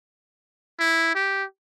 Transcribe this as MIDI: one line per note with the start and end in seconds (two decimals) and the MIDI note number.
0.80 1.11 64
1.15 1.43 67